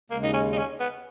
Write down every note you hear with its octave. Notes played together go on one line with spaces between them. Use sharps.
D#2 C#3 G#3 A#3
D#4
C#4
D#4
C#4
B3